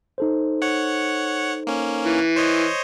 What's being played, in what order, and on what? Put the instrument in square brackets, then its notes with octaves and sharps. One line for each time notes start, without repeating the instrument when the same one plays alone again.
[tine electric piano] D#4 A4 C5
[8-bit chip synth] C#5 F#5
A#3 C#4
[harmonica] E3
[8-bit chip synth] C5 C#5 D#5